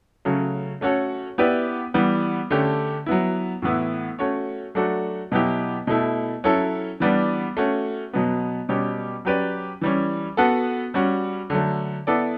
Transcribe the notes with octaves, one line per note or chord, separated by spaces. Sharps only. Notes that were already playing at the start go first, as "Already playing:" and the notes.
C#3 F#3 A3 C#4
A3 C#4 F#4 A4 C#5
B3 E4 G4 B4 D5
E3 G3 B3
D3 A3 C#4 G4
F#3 B3 E4
A2 E3 B3 E4
A3 C#4 F#4 C#5
F#3 A3 D4 F#4 A4
B2 F#3 B3 E4 G4
B2 A3 E4
F#3 C#4 E4 A4
E3 G3 B3 D4
A3 C#4 F#4
B2 F#3 B3
B2 G3 C#4 G4
F#3 C#4 G4 B4 D5
E3 G3 C#4
B3 F#4 A4
G3 C#4 F#4
D3 F#3 A3
B3 E4 A4 D5